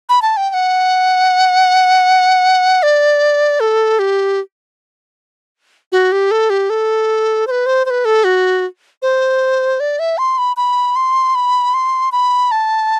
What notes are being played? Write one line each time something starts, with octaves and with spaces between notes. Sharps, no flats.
B5
A5
G5
G5
F#5
D5
A4
G4
F#4
G4
A4
G4
A4
C5
B4
C5
C5
B4
A4
F#4
C5
D5
E5
C6
B5
B5
C6
B5
C6
B5
A5